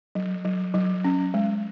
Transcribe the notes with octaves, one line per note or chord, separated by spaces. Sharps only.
F#3
F#3
F#3
C#4
G#3